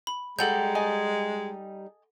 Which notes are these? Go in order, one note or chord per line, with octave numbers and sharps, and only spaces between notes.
B5
G3 G#3 D#4 A4 F#5 G6
D#5 G#5 A5